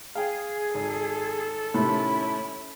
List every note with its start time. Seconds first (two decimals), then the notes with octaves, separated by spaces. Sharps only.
0.15 G#4 F5 G5
0.74 G#1 A4
1.74 A2 C3 D#3 C#4 E4 B5